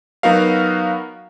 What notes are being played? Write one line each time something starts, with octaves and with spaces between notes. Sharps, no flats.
F#3 B3 D#4 F#4 A#4 F5